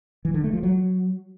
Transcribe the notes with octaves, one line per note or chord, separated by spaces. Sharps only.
E3
D3
A3
F3
F#3